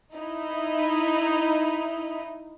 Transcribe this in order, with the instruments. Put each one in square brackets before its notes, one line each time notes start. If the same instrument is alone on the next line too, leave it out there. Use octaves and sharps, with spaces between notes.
[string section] D#4 E4